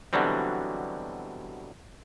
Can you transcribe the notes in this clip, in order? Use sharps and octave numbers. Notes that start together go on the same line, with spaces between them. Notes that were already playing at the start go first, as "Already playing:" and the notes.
B2 D3 E3 F#3 G3 C4